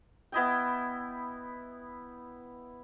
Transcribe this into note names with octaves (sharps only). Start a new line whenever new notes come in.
B3 E4 D#5 G5